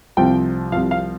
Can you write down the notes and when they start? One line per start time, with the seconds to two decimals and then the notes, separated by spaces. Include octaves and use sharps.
0.17 C2 C3 F3 G5
0.72 C2 C3 F3 F5
0.91 F5